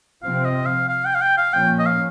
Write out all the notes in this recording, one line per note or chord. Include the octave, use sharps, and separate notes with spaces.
C3 F3 C4 F5
D#5
F5
F5
G5
F5
G5
F5
A#2 F3 A#3 C#4 G5
D#5
F5